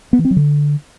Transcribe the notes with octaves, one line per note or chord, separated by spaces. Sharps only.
B3
E3
C4
F#3
D3